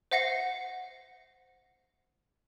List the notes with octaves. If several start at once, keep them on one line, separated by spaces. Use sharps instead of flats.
C5 E5 F#5 A#6 C7 C#7